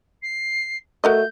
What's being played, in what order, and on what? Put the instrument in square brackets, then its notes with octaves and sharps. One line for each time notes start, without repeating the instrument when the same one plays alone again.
[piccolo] C7
[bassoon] A3 [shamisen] F#4 A#4 D#5 [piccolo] G6